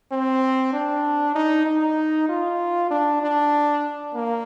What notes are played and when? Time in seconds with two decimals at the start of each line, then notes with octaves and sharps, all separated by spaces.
0.12 C4
0.73 D4
1.35 D#4
1.66 D#4
2.29 F4
2.91 D4
3.22 D4
4.15 A#3